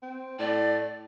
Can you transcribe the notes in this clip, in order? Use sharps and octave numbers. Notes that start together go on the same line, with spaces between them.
C4
A2 D5